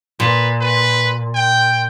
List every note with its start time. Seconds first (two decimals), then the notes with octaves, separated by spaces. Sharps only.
0.20 A#2 B4
0.61 B4
1.35 G5